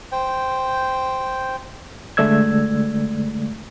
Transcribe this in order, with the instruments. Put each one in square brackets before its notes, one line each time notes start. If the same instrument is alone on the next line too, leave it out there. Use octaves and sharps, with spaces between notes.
[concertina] C5 G5
[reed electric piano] D3 G#3 A3 D5 E6 G#6